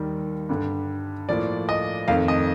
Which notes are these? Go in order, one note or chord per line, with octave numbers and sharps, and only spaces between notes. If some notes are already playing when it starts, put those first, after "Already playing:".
Already playing: D#2 D#3 G3 A#4
G2 D3 G3
A2 F3 A#3 D5
D#5
F2 D#3 A3 F5
D#5